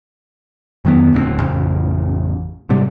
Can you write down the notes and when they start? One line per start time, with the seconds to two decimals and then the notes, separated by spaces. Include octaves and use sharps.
0.85 F2 D#3 F#3 B3
1.13 D#1 D2 G#3 C4
1.39 A1 F2 C#3
2.69 G#2 C3 G3